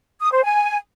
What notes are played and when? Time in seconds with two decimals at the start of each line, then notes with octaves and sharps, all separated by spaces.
0.21 D#6
0.32 C5
0.44 G#5